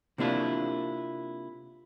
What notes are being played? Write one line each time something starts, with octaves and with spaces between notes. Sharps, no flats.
C3 A#3 D4 E4 F4